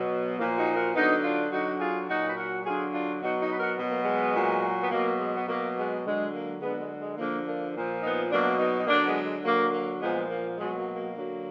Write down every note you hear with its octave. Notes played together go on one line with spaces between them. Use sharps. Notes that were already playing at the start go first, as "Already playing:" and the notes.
Already playing: B2 F#3
A#2 F3 A#3
D#4 F#4
F#4 A#4
D3 F#3 B3 D#4
D4 F4
D3 F#3 D#4 F#4
F4 G#4
A#2 F#3 D#4 F#4
B4
F#4 A#4
D3 F#3 F4 G#4
D4 F4
B2 F#3 D#4 F#4
D#4 F#4
B4
F#4 A#4
B2 F#3 B3
A#3
G#3 B3
A#2 F#3
B3
B2 F#3 A#3
G#3
B3
B2 F#3 A#3
G#3 B3
D3 F#3 G#3
A#3
D3 F#3 G#3 B3
G#3
G#3
D3 F3 A#3
A#3 D4
A#2
F3
B3 D#4
B2 F#3 A#3 D4
B3 D#4
D#4
D3 F#3 A#3 D4
G#3 B3
G#3
D3 F#3 A#3
A#3
A#2 F3 G#3 B3
A#3
B2 F#3 G#3
A#3
A#3
D3 F#3